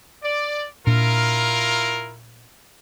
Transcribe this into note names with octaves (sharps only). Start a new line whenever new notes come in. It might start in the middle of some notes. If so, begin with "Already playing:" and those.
D5
A#2 D4 E4 F4 A#4